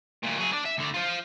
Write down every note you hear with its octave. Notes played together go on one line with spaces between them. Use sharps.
D2 A#2
F#3 G#4
D4 D5
E5
D2 D3
F4 C5